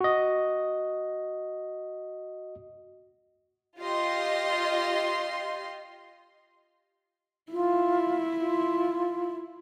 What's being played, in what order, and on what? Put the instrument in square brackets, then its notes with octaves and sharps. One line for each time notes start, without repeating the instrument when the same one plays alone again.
[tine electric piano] F#4 D#5
[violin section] F4 G4 D#5 C6
[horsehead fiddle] E4 [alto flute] F4
[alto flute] F4